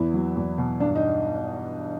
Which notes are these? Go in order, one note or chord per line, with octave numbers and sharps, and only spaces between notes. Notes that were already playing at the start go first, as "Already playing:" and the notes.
Already playing: E2 B3 E4
F#3
E2
B2
G2 D4
D#4